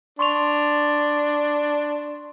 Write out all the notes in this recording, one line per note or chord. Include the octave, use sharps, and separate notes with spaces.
D4 C6 C#6 F7